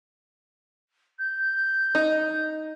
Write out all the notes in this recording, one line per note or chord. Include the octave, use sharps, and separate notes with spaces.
G6
D#4